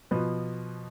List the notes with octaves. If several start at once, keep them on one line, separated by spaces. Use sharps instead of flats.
B2 F3 B4